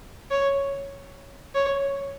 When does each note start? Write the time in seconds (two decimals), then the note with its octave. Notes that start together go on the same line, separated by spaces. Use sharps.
0.31 C#5
1.55 C#5